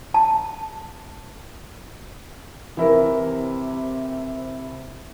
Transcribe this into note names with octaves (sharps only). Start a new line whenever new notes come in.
A5
C3 E3 E4 A#4